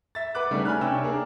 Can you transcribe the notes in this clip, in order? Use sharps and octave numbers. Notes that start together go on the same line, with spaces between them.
E5 A6
B4 F#5 D6 F#6
C#3 G3 A3 B3 D4 D#4
G#5 B5 F6 F#6
C3 C#4 D4 G5 E6
A#3 D4 G#4 A#4